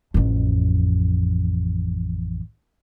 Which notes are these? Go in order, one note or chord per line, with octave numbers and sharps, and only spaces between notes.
A1 F2